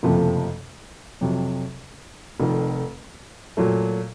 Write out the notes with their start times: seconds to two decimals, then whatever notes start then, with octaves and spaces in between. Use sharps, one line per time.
0.03 F#1 F2 C3 F3 A3
1.21 F2 C3 F#3
2.40 F1 F2 D#3
3.57 A#2 F#3 A3